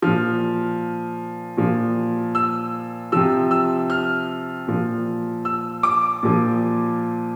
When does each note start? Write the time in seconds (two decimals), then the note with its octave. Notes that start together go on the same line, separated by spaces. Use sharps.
0.02 A#2 F3 F6
1.57 A#2 F3
2.35 E6
3.12 C3 F3 E6
3.51 E6
3.90 F6
4.67 A#2 F3
5.45 E6
5.83 D6
6.23 A#2 F3